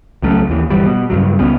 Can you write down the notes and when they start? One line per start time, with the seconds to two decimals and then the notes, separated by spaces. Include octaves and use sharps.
0.22 C#2 F#3 A3 C#4
0.49 D#2 E3
0.70 G1 E3 G3
0.85 B2
1.10 G2 C#3 F#3
1.39 C#2 B3 C#4